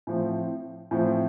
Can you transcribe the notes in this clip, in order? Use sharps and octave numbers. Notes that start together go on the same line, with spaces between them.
A2 F3 C4
A2 F3 C4